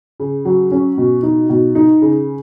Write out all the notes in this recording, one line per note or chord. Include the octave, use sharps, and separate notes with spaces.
C#3
F#3
C#4
B2
D#4
B2
D#4
C#3